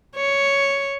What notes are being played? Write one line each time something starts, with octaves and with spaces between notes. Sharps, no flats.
C#5